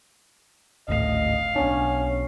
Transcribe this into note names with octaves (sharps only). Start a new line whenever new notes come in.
G#1 D2 A2 D#5 F5
B1 B3 C#4 D4